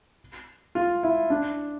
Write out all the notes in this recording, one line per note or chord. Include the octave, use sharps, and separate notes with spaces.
F4
E4
D4